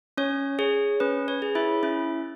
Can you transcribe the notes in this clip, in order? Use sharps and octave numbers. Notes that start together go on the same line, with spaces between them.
C#4 C#5
G#4 C#5
C#4 B4
C#5
G#4
E4 E5
C#4 E4 E5